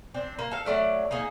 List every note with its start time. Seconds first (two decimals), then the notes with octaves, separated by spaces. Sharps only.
0.14 C4 D4
0.39 A#3
0.51 A4 F5
0.65 F#3 A3 D5 F5
1.11 A#3 D#4 G#4